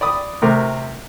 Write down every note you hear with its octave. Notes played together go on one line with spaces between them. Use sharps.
D5 B5 D#6
A2 C3 A#4